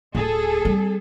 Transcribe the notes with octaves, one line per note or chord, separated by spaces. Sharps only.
D1 G#4 A4
G3 C4